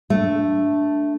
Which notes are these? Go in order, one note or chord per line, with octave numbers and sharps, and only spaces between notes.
A3 D4